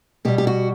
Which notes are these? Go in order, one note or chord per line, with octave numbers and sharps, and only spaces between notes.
B2 G3 G4
G4
F#4